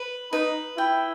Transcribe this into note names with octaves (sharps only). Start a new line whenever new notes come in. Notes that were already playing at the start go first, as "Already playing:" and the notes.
Already playing: B4
D#4 B4
E4 G5